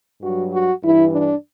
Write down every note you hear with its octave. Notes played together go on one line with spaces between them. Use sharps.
G2 F#3 F#4
F#4
G2 E3 E4
D4